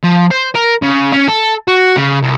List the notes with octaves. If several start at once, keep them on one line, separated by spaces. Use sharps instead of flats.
F3
C5
A#4
C#3
C#4
A4
F#4
C#3
C2